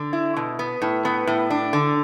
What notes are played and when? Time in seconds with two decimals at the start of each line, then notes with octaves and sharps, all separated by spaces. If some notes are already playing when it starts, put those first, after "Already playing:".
Already playing: D3
0.13 E4
0.36 B2
0.59 B3
0.82 A2
1.05 B3
1.27 A2
1.50 D4
1.73 D3